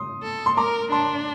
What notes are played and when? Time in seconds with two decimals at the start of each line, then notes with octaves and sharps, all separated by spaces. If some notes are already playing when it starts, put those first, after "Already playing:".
Already playing: C6 D#6
0.23 A4
0.46 C6
0.57 A#4 A#5 D6
0.91 D4 A5 C6